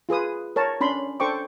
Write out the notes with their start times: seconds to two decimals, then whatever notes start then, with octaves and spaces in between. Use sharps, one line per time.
0.09 F4 G#4 B4 D#6
0.56 A#4 C#5 A5
0.81 C#4 D4 B5 C6
1.20 D4 A4 C5 G5 C#6 D6